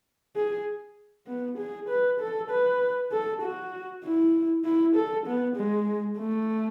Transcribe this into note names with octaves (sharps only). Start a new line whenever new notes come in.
G#4
B3
G#4
B4
A4
B4
A4
F#4
E4
E4
A4
B3
G#3
A3